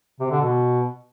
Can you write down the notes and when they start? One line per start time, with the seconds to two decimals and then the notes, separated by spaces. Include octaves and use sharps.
0.20 C3
0.31 D3
0.41 B2